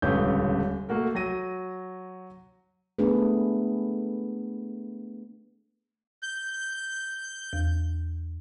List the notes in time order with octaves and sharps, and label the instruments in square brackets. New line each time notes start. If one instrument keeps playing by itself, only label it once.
[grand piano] D#1 C#2 D3 B4 C#5 G6
A3 A#3 F#4 A#4
F#3 A#6 D#7
[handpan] A3 B3 D4 G#4 B4
[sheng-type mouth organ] G6
[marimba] E2